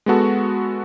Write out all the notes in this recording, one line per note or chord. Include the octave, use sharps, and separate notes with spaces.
G#3 B3 F#4 A4